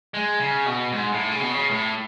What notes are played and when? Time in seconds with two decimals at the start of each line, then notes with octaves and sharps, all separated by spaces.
0.14 G#3
0.39 C#3
0.66 B2
0.92 G#2
1.12 A2
1.31 C#3
1.41 B2
1.51 C#3
1.70 A2